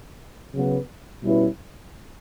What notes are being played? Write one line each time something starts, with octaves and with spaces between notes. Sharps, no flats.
C#3 F#3 B3
B2 G3 C#4 E4 B4